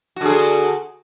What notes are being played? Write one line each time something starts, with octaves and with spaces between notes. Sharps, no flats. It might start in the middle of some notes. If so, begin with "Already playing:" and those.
D3 F#4 G#4